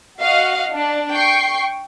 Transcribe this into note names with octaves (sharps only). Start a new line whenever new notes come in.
F#4 D#5 F5 F#5
D4
G5 C#6 C7